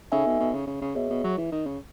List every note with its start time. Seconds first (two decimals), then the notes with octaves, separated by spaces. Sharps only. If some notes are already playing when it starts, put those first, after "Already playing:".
0.12 C#3 D#4 A4 E5 G#5
0.26 B2
0.40 B2
0.53 C#3
0.67 C#3
0.81 C#3
0.95 B2 G#4 C#5 E5
1.10 B2
1.24 F#3
1.38 E3
1.52 D#3
1.66 C#3